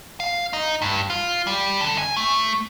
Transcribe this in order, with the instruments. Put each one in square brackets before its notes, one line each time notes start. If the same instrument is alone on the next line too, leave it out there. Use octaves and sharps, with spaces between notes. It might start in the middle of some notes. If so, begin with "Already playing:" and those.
[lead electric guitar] F5
D#4
G2
F4
G3
D3
G#5
A3